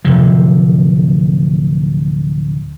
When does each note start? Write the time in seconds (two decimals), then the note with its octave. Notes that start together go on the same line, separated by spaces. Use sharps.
0.05 D1 C3 F3